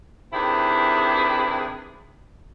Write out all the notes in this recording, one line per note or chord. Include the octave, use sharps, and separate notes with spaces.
C3 D#3 E3 D4 E4 G#4